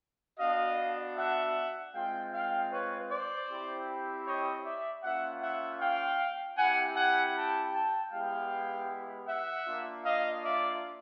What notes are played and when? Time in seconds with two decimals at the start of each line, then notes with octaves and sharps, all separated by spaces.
0.39 B3 D4 F#4 D#5 F5
1.17 E5 F#5
1.94 G#3 C4 F4 F5 G5
2.32 F5 G5
2.72 B4 C#5
3.10 C5 D5
3.49 C4 E4 G4
4.26 C#5 D#5
4.64 D5 E5
5.03 A#3 C#4 F4 E5 F#5
5.41 E5 F#5
5.80 F5 G5
6.58 C4 E4 G4 F#5 G#5
6.96 F#5 G#5
7.35 G5 A5
7.73 G5 A5
8.12 G#3 B3 E4 G4 F5 G5
9.28 E5 F#5
9.67 A#3 D4 F4
10.05 D#5 F5
10.44 D5 E5